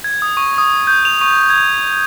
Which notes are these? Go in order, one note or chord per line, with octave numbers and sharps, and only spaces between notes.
G#6
D#6
C#6
D#6
G6
F7
C#6
G#6